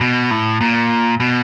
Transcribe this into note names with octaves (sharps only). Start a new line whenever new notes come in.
B2
A2
A#2
B2